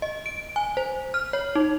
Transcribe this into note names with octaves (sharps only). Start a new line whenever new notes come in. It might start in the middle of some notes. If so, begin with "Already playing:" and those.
D#5
D7
G#5
C5
F6
C#5
D#4